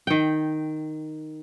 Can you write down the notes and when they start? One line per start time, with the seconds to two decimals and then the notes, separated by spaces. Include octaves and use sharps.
0.07 D#3 G5